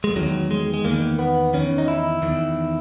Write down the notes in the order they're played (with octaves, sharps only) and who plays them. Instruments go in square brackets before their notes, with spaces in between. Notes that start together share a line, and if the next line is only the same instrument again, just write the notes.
[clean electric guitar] G#3
E2 D#3 F#3
G#3
G#3
E2 D#3 A#3
B3
E2 D#3 C#4
D#4
E4
E2 D#3